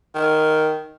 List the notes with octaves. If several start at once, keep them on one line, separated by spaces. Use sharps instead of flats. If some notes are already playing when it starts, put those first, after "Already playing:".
D#3